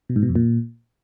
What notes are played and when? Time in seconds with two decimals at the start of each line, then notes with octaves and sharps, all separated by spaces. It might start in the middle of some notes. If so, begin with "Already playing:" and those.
0.09 B2
0.16 G#2
0.22 B2
0.29 F2
0.36 A#2